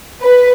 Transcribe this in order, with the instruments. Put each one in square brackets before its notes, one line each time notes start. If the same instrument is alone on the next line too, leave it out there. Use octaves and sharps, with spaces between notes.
[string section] B4